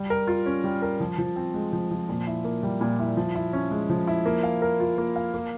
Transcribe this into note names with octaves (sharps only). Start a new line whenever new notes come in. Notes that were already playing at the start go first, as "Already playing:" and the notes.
Already playing: G3
A#4
F4
C#4
G3
A#4
F3
F3
C4
G#3
F3
F3
A#2
E4
A#3
G3
A#2
E4
F3
E4
C#4
G#3
F3
E4
A#3
F5
A#4
F4
A#3
F5
A#3